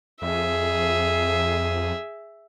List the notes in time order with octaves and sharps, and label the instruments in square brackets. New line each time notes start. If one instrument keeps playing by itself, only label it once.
[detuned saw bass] F2 [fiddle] G#4 E5